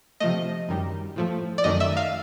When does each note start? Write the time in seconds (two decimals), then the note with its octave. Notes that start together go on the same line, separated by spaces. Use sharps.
0.20 C3 F3 A3 D#5
0.69 F#2 D#3 G3
1.16 A2 F3 A3
1.58 D5
1.64 F#2 D#3 F#3 A3 D#5
1.80 E5
1.97 F5